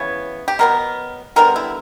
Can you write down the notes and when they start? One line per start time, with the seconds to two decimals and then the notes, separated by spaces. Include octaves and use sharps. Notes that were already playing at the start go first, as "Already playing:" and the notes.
Already playing: C#3 E3 B3 C#5
0.48 G4
0.59 B2 F#3 B3 A#4
1.36 D3 G3 B3 A#4
1.56 E4